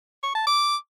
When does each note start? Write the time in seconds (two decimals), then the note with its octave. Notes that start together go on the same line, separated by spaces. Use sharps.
0.23 C#6
0.35 A5
0.47 D6